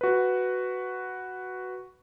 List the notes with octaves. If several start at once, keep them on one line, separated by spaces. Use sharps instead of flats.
F#4 B4